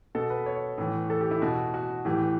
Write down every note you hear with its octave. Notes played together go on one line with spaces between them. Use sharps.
B2 A4
B4
C#5
A2 E3
A4
G4
E4
B2 F#4
F#4
A2 E3 G4